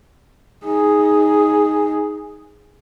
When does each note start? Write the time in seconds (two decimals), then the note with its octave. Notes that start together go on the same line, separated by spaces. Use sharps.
0.65 D#4 G#4